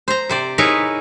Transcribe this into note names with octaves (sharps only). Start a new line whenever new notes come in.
C5 A#5
C3 C5 D5
D#4 E4 G#4 A#4 B4 C#5